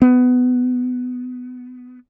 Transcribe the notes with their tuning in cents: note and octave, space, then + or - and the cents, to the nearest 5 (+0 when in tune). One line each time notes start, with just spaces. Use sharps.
B3 +20